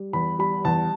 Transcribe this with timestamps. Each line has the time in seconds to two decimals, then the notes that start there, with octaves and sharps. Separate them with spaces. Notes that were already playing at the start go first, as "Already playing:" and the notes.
Already playing: G3
0.13 E2 B5
0.39 G3 B5
0.65 E2 A5